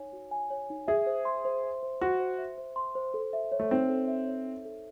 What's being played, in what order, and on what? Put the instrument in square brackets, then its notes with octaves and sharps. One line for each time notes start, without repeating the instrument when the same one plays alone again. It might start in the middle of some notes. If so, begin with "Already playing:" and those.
Already playing: [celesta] D#4 C#5 G#5
F#4
G#5
C#5
D#4
[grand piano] G#4 [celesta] E5
[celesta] C5
C6
C5
E5
C5
[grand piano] F#4 [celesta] C6
[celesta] C5
E5
C5
C6
C5
A4
E5
C#5
[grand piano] A3
[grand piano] C4 [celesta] D#4
[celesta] A4
E5
C#5
D#4
A4